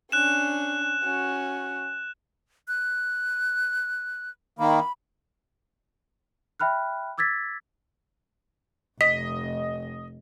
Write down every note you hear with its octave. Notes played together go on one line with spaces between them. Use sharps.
C#4 D4 F#6 E7
C#4 F#4
F#6
D#3 A#3 B5
E5 G5 B5 F6 F#6
D6 E6 G#6 A6 B6
F1 D#5 B6